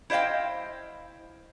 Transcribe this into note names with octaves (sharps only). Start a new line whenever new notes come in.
E4 C5 D#5 F5 G5